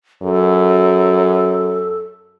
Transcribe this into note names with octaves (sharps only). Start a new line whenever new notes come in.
F#2 A4